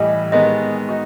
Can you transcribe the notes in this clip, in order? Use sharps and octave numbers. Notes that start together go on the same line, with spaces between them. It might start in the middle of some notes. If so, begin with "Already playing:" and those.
Already playing: A2 E3 G3 D#5
D#3 G#3 B3 D#5
D#4 F#4